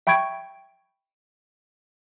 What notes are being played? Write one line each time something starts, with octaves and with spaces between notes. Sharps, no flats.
E5 G5 B5 C#6 G#6 D7